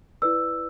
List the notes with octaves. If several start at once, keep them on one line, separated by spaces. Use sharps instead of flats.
E4 B4 D5 E6